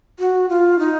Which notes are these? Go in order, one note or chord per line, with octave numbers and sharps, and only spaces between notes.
F#4
F4
D#4